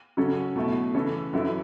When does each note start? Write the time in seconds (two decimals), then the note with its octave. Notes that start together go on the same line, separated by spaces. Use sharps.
0.17 C#3 F#3 C#4 A4
0.56 B2 F#3 A3 E4
0.94 C#3 E3 C#4 A4
1.33 F#2 E3 C#4 E4 A4